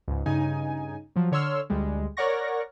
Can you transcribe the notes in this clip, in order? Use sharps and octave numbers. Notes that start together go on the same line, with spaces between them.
C#2 G#2
G2 C#3 D#4 G#5
F3 F#3
D3 C#5 C6 E6 F6
D2 G3 G#3
A#4 C#5 D5 F#5 C#6 A#6